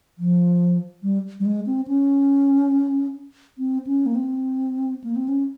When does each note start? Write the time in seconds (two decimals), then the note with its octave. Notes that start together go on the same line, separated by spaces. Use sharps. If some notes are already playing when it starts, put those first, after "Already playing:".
0.18 F3
1.03 G3
1.40 G3
1.45 G#3
1.66 C4
1.87 C#4
3.58 C4
3.87 C#4
4.06 A#3
4.15 C4
5.04 A#3
5.16 C4
5.28 C#4